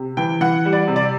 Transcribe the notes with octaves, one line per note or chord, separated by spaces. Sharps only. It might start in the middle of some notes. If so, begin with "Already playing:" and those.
Already playing: C3
E3 G5
E3 F#5
G3
D5
C3
D5